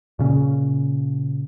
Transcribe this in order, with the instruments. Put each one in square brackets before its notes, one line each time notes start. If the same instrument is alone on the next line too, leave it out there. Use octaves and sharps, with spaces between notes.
[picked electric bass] A#2 C#3 C#4